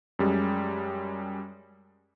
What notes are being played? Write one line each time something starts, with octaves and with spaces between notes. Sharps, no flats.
F#2 G3 G#3